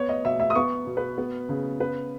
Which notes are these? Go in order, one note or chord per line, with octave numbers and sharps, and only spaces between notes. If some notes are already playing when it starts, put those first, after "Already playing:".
Already playing: B3 C#5
D#5
B2 E5
E5
D#6
B3 C#6
B2
B4
B3
C#3
B3 B4